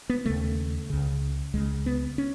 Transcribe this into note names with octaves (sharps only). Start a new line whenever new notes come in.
B3
D#2 C#3 A3
C#2 C#3
C#2 C#3 G#3
B3
C#4